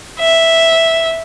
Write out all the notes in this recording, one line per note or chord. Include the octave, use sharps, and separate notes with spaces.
E5